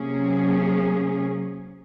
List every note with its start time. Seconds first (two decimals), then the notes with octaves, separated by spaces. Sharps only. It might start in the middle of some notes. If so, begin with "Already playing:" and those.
Already playing: C3 F#3 A#3 C#4 G#4